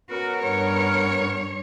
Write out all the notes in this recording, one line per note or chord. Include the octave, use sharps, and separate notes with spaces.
B3 C#4 F#4 A#4
G2 C#5